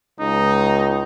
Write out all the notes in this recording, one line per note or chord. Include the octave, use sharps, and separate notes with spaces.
C#2 D#4